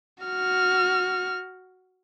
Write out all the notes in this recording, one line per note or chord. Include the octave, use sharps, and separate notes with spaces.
F#4 F6